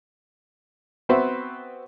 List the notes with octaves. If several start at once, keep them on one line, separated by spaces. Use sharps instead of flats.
B3 C4 F#4 B4 C5 E5